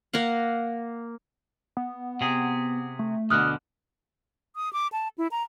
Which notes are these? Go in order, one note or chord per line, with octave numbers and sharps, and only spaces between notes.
A#3 A#4 F5 F#5
B3
C3 G#4
A3
D2 B2 D3 D#6 F6 F#6
D#6
D6
A5
E4
A#5